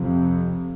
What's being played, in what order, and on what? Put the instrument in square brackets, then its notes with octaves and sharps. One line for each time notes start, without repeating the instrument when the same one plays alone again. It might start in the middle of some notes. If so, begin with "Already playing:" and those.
Already playing: [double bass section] F2 C3